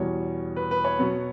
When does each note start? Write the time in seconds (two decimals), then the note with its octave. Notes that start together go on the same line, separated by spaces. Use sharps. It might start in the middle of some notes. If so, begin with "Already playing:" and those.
Already playing: E2 B2 G3 C#5
0.56 B4
0.71 B4
0.84 C#5
0.99 B2 F#3 B3